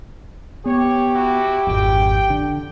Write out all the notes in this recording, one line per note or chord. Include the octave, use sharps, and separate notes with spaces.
B3 G4 C#5
E4 F#4
G#1 F2 G5
D3